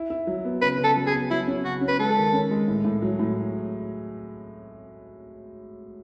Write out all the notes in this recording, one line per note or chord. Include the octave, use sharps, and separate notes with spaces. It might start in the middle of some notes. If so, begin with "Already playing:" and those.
Already playing: E4
E4
F#3
B3
C#3 B4
C#3
A4
F#3
G#4
B3
F#3 E4
C#4
C#3 F#4
C#4
B4
G#3 A4
D#3
C#4
G#3
A2
A2
F#3
A2